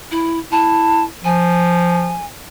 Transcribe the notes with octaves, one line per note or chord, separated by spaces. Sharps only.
E4
E4 A5
F3 G#5